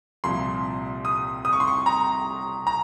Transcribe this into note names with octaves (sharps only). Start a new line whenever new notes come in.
C2 A#2 F3 C6
D#6
D#6
C#6
C6
C#6
A#5
A#5